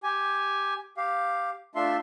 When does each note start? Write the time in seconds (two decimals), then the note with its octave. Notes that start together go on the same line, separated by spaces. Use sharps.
0.03 G4 G#5
0.97 G4 F5
1.75 A3 D4 F4 E5 C6